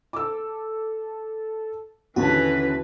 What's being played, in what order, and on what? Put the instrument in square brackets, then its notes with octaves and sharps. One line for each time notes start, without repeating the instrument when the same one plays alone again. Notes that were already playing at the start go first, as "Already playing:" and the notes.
[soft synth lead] A4 [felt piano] D6 E6
[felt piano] D#2 D3 A5 [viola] E3 B4 [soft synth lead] C#4 [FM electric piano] F#4